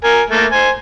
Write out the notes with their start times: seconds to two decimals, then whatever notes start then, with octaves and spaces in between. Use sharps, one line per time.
0.04 A#4 G#5
0.30 A3 A#3
0.51 C5 G#5